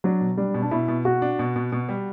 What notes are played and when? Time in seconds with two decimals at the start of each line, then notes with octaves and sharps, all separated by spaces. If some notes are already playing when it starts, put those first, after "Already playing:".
0.04 F#3 D4
0.21 B2
0.37 G3 D4
0.54 B2
0.62 D4
0.71 B2 E4
0.88 B2
1.05 B2 F#4
1.22 D4
1.39 B2
1.56 B2
1.72 B2
1.89 G3